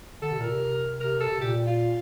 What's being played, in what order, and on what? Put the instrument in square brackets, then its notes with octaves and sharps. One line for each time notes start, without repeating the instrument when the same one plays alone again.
[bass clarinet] D3 [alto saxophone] A4
[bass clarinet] C3
[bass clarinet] A#2 [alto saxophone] A#4
[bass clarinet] C3
[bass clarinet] C3 [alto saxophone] A#4
[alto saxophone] A4
[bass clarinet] C3
[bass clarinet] A#2 [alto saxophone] G4
[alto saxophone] F4